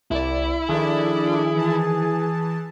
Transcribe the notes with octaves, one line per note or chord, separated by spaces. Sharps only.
C2 E4 D5
D#3 F3 D4 G#4 A4 D5
E3 A5